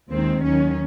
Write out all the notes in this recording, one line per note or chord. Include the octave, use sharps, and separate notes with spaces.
D#2 D#3 G#3 C4
D#2 D#3 F#3 C#4